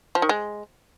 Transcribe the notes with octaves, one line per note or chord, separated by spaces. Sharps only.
F3
D#3
G#3